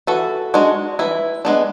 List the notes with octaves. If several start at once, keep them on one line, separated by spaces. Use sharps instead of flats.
E3 F#4 A4
G#3 D4 F#4
E3 E4
G#3 B3 D4